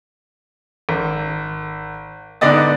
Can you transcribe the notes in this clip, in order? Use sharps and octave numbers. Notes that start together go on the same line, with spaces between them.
G#1
G#2 D3 B3 D5 D#5 A6